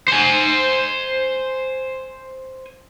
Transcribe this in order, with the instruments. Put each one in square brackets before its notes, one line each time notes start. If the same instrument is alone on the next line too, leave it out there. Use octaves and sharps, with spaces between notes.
[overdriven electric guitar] C5 G#5